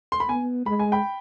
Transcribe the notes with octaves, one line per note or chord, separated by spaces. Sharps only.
C6
B5
B3 G#5
G#3 B5
G#5
G5 B5